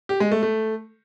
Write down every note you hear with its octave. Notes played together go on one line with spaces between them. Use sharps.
G4
G#3
A3
A3